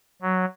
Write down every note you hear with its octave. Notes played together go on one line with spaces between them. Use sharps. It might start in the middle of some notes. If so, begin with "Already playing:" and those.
F#3